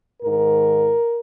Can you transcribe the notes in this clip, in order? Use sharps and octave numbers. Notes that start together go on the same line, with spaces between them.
G#2 D#3 A#4